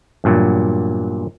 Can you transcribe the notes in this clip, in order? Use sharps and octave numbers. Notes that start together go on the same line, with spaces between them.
E2 G2 A#2 F#3